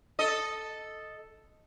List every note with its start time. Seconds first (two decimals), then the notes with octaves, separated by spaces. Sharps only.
0.19 A4 D#5